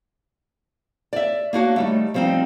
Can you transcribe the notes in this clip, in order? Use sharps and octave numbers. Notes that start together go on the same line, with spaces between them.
D5 E5
A#3 D4 F#4 C#5
D#3 G3 A3
F3 G3 C4 D4 D#4